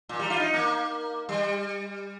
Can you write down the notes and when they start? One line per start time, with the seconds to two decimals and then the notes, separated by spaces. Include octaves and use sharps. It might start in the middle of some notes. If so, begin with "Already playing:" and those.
0.09 A#2
0.19 G3
0.30 F4
0.40 D#4
0.54 A#3
1.29 G3